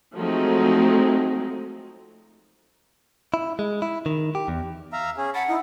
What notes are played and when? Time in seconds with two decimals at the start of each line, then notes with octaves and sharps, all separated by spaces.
0.15 F3 F#3 G#3 A3 C4 D#4
3.34 E4
3.59 G#3
3.82 E4
4.06 D#3
4.35 G4
4.48 E2
4.93 E5 F5 A#5
5.17 C#4 G#4
5.34 F#5 A5 B5
5.49 D#4 E4